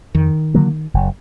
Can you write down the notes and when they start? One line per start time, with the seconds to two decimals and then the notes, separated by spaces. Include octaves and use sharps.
0.15 F2 D#3
0.54 D3 F#3 A#3
0.94 F#1